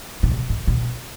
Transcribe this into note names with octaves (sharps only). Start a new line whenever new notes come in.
B2
C3
G#2
B2